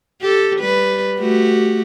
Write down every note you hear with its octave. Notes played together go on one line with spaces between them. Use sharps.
G4 A4
G3 B4
A3 F#4 G4